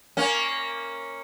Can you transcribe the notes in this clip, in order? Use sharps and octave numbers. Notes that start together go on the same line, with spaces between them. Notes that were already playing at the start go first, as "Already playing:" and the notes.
A#3 C#4